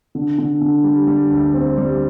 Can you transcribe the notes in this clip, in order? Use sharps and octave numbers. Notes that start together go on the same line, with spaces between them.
D3
D3
D3
G3
G3
D2
C4
G3